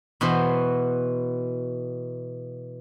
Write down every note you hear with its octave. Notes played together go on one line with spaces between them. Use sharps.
B2 E3 F#4 C5